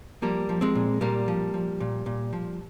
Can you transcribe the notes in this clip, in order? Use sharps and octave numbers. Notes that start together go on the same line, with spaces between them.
F3 G3 A#3
F3
G#3 C4
A#2
A#2 G3 A#3
F3
F3
A#2
A#2
F3